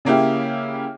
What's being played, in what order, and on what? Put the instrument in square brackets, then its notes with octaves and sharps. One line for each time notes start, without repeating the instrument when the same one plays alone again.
[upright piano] C#3 A#3 E4 G4